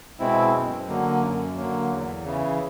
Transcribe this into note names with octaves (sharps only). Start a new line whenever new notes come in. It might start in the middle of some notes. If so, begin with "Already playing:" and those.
B2 G#3 C4 E4
F#2
D3 F#3 A#3
F#2
D3 F#3 A#3
E2
C#3 E3